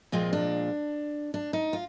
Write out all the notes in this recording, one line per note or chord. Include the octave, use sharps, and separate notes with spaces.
A#2 F3 G#3 C4
D4
D4
D#4
F4